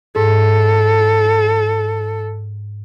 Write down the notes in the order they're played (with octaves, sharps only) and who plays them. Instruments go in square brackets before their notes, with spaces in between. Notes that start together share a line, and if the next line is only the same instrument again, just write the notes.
[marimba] G#2 [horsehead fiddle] A4